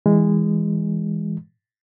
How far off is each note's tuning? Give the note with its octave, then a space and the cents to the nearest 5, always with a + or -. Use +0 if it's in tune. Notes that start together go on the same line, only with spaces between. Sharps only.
E3 -10 G#3 -20